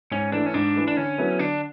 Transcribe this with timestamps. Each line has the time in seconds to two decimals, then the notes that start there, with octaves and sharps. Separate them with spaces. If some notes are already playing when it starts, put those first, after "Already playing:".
0.11 G#2 C#4
0.32 E3 A3 D4
0.46 C#4
0.54 G#2 D4
0.75 E3 A3
0.88 D4
0.97 D3 C#4
1.18 F#3 B3 E4 A4
1.39 D3 D4